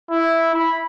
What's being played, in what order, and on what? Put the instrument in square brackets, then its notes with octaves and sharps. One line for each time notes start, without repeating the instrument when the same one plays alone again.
[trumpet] E4
B5